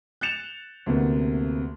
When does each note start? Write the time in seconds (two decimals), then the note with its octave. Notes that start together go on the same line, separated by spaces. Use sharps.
0.21 F#6 G6 A6 C#7 E7 F7
0.86 D2 C3 A#3 B3